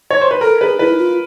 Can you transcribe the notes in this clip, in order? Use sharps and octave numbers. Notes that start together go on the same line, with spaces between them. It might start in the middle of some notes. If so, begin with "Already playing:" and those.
C#5
C5
B4
A4 A#4
G#4 B4
E4 B4
F4